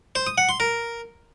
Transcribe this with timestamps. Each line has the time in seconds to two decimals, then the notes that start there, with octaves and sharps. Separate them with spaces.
0.15 C5
0.27 D#6
0.38 F#5
0.49 C6
0.60 A#4